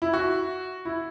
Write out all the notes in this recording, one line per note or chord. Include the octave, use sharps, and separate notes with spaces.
E4
F#4
E4